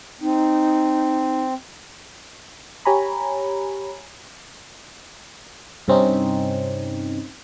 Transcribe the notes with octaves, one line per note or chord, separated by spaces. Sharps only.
C4 D#4
G4 C#5 G#5 A#5 B5
G2 C3 C4 C#4 D#4